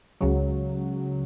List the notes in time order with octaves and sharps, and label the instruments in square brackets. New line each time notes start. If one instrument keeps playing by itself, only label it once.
[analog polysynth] C#2 C#3 F#3